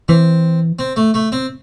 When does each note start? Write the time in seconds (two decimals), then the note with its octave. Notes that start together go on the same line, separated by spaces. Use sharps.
0.08 E3 C4
0.79 C4
0.96 A3
1.14 A3
1.32 C4